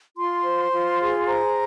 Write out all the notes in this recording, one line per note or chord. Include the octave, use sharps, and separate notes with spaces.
F4 C6
C5
F4
G#4
C5 A#5